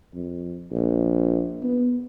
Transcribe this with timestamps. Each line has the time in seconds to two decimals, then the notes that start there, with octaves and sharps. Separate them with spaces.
0.14 F2
0.72 A#1
1.62 B3